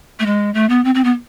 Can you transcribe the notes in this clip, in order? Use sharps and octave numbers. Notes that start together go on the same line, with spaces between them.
A3
G#3
A3
B3
C4
C4
B3